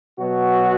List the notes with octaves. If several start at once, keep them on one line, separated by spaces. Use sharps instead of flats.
B2 F#3 F#4